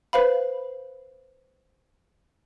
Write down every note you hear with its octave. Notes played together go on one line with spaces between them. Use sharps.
B4 C5 F5 B5